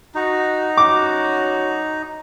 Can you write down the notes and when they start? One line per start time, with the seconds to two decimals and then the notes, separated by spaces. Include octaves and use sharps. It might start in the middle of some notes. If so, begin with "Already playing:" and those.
0.15 D#4 F#4
0.77 F#3 C#4 F#4 D6